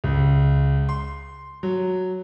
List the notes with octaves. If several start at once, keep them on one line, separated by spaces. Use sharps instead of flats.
C#2
C6
F#3